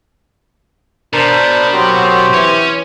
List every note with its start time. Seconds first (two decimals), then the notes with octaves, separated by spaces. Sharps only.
1.13 B2 D4 A#4 C5 A5 B5
1.73 F#3 C4 F#4 G4
2.34 E3 C#4